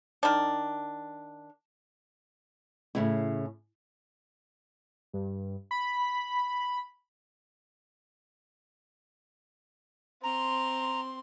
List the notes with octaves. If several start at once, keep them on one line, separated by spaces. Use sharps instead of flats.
D#3 D4
A2 C#3 E4
G2
B5
C4 A#5 C6